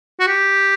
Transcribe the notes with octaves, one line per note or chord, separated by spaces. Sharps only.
F#4
G4